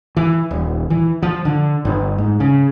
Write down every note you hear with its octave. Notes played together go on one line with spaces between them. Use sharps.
E3
D#1
E3
F3
D3
G1
G#2
C#3